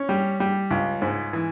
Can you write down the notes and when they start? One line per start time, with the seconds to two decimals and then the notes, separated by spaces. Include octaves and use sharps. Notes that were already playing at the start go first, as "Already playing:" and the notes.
Already playing: C#4
0.09 G3
0.40 G3
0.71 C#2
1.02 G#2
1.33 E3